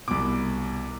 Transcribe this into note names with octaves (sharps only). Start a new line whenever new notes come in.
C2 B2 D6